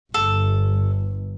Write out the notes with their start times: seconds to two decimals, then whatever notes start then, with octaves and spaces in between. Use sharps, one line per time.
0.14 G1 A4